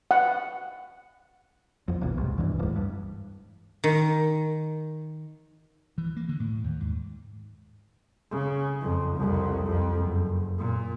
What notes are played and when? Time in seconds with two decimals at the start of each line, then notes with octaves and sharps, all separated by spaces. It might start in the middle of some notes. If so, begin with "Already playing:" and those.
0.11 F#5
1.88 E1 F2
2.01 D#1 B1
2.18 C2 G#2
2.38 D#1 G2 E3
2.59 D1 G#2
2.76 G2
3.84 D#3
5.98 E3
6.16 A#3
6.29 D3
6.40 A2
6.64 D#2
6.80 G#2
8.31 C#3
8.81 F2
9.16 C2 F2
9.66 F2
9.96 F#1
10.58 A#2